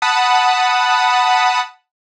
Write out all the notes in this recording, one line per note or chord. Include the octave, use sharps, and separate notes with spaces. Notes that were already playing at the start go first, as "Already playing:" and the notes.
F#5 A5 B5 D#6